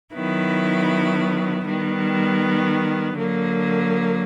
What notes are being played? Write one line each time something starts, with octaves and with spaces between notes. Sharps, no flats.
D#3 F#3 B3 E4
D#3 G3 B3
D3 F#3 A#3